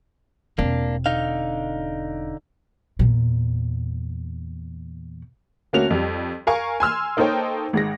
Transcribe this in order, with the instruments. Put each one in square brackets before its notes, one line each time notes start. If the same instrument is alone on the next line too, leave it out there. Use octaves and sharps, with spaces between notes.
[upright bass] E1 C4 [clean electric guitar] A#3 D4
[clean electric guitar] D3 D#4 F5
[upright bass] E2 A#2
[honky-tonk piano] D2 A3 A#3 C#4 F#4 F7
F2 G3
A#4 F5 G#5 C#6
G#5 C6 E6 F6
A#3 D#4 A4 C5 C#5 G5
G#1 G#3 A#6